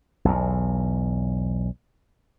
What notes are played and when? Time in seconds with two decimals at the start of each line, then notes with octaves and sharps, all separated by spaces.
0.25 B1 E2